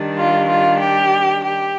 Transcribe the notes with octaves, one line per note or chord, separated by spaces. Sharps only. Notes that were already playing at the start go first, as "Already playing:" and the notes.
Already playing: D#3 G3 D4
F4
F4
G4
G4